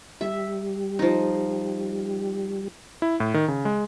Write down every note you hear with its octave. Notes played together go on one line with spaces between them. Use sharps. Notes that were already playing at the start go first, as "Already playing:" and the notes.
G3 E5
F3 D#4
E4
A2
D#3
C#3
G#3